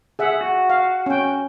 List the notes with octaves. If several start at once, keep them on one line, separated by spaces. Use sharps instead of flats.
G#4 E5 F#5
F#4
F5
C#4 G5